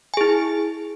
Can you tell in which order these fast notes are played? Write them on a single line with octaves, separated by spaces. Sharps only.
G#5 G#4 E4